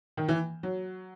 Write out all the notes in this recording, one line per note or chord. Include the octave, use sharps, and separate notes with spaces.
D#3
E3
F#3